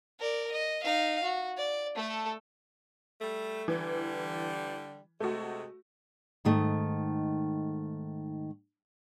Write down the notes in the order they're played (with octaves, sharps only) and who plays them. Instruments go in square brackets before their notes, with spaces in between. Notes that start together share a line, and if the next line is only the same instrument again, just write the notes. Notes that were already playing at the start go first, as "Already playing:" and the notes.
[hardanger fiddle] A#4 D5
D#5
D#4 F5
F#4
D5
A3 A4
[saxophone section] G3 A3
[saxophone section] D3 G3 [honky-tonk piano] E3
[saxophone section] C3 G#3 [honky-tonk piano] A3 F#4
[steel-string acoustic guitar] G#2 D#3 A3